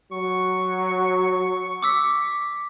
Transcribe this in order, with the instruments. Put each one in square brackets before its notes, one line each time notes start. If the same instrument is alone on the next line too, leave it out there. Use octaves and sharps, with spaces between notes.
[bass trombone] F#3 [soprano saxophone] C#6
[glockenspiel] D6 E6 B6